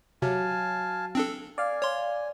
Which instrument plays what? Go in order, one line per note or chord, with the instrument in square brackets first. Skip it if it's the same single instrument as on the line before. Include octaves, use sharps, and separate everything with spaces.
[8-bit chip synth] C3 [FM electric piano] F#3 [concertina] F5 G#5 A5
[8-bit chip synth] C4 D4 A4
[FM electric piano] D5 F5 [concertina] G#5
[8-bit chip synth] C#5 C6